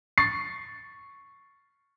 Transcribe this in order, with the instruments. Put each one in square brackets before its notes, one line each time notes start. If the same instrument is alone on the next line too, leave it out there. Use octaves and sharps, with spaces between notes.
[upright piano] C#6 A6 C7